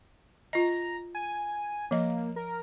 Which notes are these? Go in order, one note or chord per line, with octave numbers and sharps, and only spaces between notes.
F4 D#5 A#5
G#5
F3 A#3 D#5
A#4